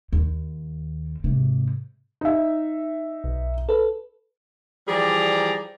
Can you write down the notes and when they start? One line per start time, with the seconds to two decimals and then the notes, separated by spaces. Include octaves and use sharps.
0.13 D#2
1.24 G#2 C3
2.21 D#4 E5
3.24 B1
3.69 A4 B4
4.87 E3 F3 G3 G#4 D5 A#5